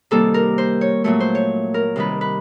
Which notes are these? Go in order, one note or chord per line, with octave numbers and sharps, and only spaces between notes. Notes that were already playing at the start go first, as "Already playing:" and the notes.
C3 D#3 G3 A#3 A4
A#4
C5
C#5
A#2 F#3 A3 C#5
C5
C#5
A#4
C3 D#3 G3 B4
B4